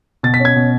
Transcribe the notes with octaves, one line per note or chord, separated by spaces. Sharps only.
B2 A6
B6
C#4
G#6
B2